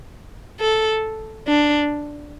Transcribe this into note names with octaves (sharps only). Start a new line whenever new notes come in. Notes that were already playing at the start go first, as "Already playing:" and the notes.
A4
D4